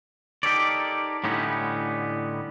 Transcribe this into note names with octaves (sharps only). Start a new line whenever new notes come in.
D#4 G4 A4 A#4 C#5 D5
A2 D3 G3 B3 C#4 D#4